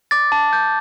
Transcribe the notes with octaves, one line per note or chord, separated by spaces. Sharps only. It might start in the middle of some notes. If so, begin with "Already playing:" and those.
D6 A6
A5
G6